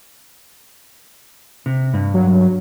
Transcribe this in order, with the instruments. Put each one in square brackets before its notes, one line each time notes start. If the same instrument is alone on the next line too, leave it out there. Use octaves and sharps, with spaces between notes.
[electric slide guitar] C3
G2
[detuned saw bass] F#3